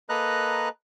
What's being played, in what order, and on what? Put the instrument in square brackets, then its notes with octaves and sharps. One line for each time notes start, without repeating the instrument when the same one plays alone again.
[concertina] A#3 A4 B4 D#5 A#5 F#6